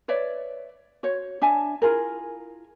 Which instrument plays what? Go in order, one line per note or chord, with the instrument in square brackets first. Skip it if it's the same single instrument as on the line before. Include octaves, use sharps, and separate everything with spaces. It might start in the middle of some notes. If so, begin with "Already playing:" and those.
[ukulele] B4 C#5 D5 E5
F#4 C5 C#5
D4 E5 G#5 A5
E4 F4 G#4 A#4